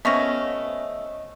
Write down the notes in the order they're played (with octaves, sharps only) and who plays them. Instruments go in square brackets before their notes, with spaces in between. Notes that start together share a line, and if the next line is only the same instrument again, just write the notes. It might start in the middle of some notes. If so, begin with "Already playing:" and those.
[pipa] F3 A3 [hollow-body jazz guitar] B3 C#4 [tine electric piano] D#5 [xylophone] E5 C#6 A#6